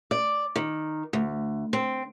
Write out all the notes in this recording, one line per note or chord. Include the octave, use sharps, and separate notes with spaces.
D5
D#3
D2
C4